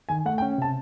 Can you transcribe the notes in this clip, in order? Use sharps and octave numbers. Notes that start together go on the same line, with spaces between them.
D#3 G#5
A3 F#5
G5
C#4
C3 A5